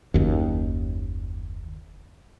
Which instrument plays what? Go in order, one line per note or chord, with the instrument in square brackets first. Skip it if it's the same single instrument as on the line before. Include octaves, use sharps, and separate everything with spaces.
[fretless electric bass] F#1 D#2